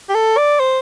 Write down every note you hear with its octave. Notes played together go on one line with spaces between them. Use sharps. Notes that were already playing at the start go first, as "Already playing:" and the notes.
G4
A4
D5
C5